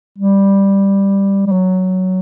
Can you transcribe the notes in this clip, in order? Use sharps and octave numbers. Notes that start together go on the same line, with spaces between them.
G3
G3
F#3